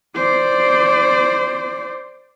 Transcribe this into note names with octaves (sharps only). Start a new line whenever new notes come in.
C5 D5